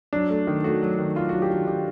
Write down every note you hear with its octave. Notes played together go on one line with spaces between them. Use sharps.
F#3 D4
A3
D#3
A3 F#4
F#3
D#3
F#3 F4
F#4
F#3
G4
D#3
D#3 G4